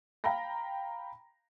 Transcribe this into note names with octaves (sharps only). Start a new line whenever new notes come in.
F5 G5 A#5 B5 A#6